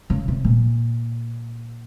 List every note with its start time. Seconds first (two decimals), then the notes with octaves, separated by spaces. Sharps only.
0.10 C#3
0.28 C3
0.45 A#2